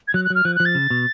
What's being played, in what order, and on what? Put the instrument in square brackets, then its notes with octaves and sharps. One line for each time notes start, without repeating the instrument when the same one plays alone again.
[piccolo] G#6
[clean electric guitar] F#3 [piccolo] F#6
[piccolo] F#6
[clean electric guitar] F#3 [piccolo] F6
[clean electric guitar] F3 [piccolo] F#6
[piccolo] F#6
[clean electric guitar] F3
[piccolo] A6
[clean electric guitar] C#3
B2